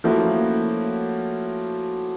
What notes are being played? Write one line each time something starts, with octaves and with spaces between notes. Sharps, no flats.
F3 A3 A#3 C#4 E4 F#4